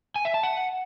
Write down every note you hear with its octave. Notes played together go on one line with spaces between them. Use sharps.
G#5
E5
A5
F#5